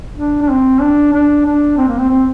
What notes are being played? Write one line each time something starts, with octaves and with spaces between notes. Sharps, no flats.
D4
D4
C4
D4
D4
D4
C4
A#3
C4
C4